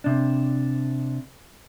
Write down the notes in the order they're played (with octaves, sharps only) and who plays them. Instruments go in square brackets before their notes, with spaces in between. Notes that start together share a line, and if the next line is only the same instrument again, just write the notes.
[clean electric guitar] C3 D4